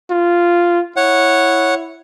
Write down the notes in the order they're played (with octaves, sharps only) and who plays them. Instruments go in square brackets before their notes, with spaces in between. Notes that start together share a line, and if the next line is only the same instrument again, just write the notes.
[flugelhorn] F4
[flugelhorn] E4 [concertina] C#5 F#5